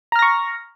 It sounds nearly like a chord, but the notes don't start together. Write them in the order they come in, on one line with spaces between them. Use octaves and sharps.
A#5 F6 A#6 C#6